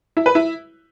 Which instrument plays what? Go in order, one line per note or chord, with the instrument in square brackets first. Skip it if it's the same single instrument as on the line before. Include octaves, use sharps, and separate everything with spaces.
[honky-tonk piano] E4
B4
E4